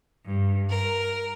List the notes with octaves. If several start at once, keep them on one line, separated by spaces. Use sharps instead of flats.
G2
A#4